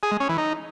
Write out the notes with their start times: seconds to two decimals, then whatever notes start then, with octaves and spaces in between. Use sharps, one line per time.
0.03 G#4
0.12 G#3
0.20 C#4
0.29 E3
0.38 D#4